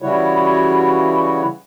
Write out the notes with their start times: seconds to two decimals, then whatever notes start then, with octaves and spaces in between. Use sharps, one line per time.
0.02 C#3 E3 G3 E4 F#4 C#5